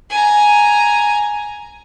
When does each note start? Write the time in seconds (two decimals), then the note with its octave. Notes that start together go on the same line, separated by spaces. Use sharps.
0.10 G#5 A#5